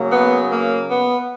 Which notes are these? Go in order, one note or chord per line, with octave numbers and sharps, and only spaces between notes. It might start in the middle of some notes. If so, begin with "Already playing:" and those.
Already playing: C#3 F#3 A#3
B3
A#3
B3